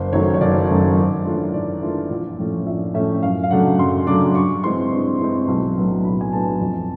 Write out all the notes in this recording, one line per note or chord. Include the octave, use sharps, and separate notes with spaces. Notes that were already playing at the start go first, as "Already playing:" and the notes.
Already playing: F#1 C5
F#2 D#3 F#3 A3 C#5
C#5
F#1 D5
F#2 D#3 F#3 A3
G#2
E3 A3 D4 F4
G#2 D5
E3 A3 D4 F4
A#1
A2 F3 A3 C#4
A#1 E5
A2 F3 A3 C#4 E5
F#2 F5
F5
C#3 F#3 A3 D4 F#5
F#2 C6
C#3 F#3 A3 D4 D6
G2 C#6
E3 G#3 C4 C6
G2
E3 G#3 C4
B1
A2 F#3 B3 D4
B1 B5
G#5
A2 F#3 B3 D4 A5
F2